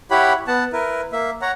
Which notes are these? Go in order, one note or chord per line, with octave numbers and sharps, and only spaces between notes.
E4 G4 C#5 F#5 B5
B3 F#5 A5
E4 A#4 B4
A#3 E5
C#5 F#5 A#5